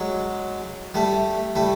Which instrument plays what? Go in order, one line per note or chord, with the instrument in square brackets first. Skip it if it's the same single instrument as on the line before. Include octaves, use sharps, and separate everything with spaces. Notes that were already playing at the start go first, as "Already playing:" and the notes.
Already playing: [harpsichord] F#3 G#3
G3 A3
G3 A3